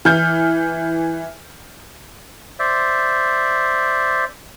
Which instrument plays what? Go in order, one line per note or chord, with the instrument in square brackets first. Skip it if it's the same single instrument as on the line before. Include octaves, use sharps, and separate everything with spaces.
[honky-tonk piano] E3 F6 G6
[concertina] C5 D5 E5